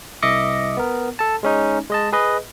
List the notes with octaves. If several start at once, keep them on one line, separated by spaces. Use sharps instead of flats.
C2 D#5 E5 D6 A#6 C#7
B3 A#4
A4 A5
G#3 C#4 D#4
G#3 D#5 A5
G#4 B4 D#5